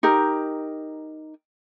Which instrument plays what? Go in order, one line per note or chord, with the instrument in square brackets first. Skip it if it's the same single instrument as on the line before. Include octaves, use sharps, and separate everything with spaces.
[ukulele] D#4 G4 A#4